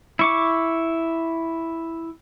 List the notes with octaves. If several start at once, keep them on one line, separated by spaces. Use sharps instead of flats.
E4 C#6 D6